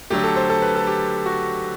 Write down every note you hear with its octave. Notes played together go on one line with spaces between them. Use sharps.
D3 F#3 A3 G4
A4
C5
A4
B4
A4
G4
F#4